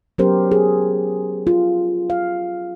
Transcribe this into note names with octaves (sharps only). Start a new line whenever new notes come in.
F#3 B3 C#4 G4 A#4 C5
G#4
F4
F5